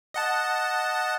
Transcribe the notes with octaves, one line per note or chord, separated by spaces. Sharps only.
D#5 F#5 A5